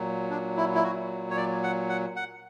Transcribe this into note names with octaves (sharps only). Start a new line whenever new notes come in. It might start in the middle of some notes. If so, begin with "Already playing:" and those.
Already playing: A#2 F#3
D4
E4
E4
F#4
C#5
D5
F#5
F#5
F#5